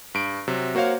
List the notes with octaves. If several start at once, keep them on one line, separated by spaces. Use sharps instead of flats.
G2 D7
C3 F#3
A#3 F#4 C5 C#5 F5